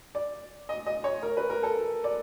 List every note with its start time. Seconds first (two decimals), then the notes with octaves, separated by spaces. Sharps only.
0.15 D5
0.69 D#5
0.87 D#5
1.04 C#5
1.23 A#4
1.37 B4
1.50 A#4
1.63 A4
2.04 D5